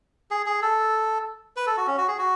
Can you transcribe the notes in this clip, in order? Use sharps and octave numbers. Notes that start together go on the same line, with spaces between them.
G#4
G#4
A4
B4
A4
F#4
C#4
F#4
G#4
F#4